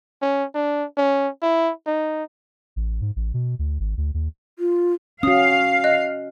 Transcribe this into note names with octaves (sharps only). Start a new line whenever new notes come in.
C#4
D4
C#4
E4
D#4
A1
G#2
A1
B2
D2
G#1
D2
D#2
F4
C#4 F#4 F5 D#6
D#5 F#6